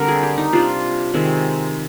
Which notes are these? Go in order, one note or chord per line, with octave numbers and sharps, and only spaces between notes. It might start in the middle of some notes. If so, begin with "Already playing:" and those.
Already playing: D3 G3 A#3 C4 A#4
G#4
G4
D#4
C3 G3 D4 F4
C3 D#3 G#3 C4